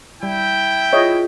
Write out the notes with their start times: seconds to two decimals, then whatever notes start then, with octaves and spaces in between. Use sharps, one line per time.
0.23 G3 E4 G5
0.93 F4 G#4 C#5 D#5 E5